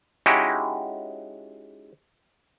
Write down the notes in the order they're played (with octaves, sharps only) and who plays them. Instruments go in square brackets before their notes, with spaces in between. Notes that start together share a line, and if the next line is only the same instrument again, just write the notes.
[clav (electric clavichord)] G#3 C#4 D#4 E4 F#4 G4